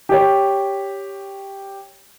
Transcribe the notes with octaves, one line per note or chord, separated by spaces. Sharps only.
G4 C#5